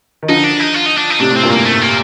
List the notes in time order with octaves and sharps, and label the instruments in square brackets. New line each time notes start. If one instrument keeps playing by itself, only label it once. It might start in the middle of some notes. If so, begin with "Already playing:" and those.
[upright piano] D#3
[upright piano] D3 F3 [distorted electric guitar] D#4
[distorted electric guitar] D4
D#4
F4
D#4
D4
D#4
[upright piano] A2 C3 [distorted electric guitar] D4
[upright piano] A2 [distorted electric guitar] C4
[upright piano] G2 A#2
[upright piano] A2 [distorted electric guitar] A#3
[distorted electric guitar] A3
A#3